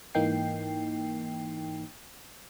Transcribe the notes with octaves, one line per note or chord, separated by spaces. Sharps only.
G#2 E3 A#3 D#4 G5 C7